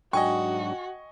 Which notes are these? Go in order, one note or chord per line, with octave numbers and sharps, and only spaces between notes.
G#2 F#3 D4 F#4 D#5 G5 G#5 C#6